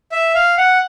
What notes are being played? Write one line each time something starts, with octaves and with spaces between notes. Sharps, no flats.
E5
F5
F#5